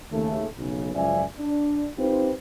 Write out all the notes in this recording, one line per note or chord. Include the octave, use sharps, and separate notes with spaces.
D#2 C#3 A3
B1 C#3
C#2 F#2 F3 D5 E5 G#5
D4
C4 D#4 F4 G4 B4 C5